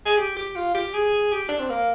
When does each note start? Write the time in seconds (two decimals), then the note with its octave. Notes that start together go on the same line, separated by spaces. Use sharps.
0.05 G#4
0.17 G4
0.37 G4
0.56 F4
0.74 G4
0.94 G#4
1.32 G4
1.49 D4
1.60 C4
1.70 A#3